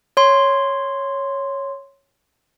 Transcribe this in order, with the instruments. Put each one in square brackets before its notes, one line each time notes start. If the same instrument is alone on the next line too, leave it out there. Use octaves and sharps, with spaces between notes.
[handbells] C#5 C6